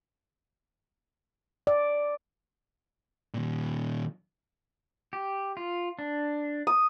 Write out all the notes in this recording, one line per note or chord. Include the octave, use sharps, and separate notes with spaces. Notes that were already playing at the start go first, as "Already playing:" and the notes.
D5
A#2 D#3
G4
F4
D4
D#6